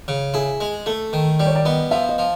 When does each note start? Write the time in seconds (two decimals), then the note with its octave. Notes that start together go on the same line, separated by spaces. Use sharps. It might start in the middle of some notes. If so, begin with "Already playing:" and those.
0.08 C#3
0.34 E4 G#4
0.61 G#3
0.86 A3 A4
1.13 D#3
1.40 G3 D5
1.47 C#5
1.56 D5
1.65 B3 D#5
1.91 F3 E5
2.09 D#5
2.18 F3